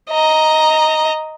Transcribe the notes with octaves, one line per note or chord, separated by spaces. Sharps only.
D#5 A#5